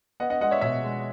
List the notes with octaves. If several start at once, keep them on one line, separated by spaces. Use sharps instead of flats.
B3 D#5 F#5
D#5 F#5
G#3 D#5 F#5
C#5 E5
B2 C#5 E5
G#3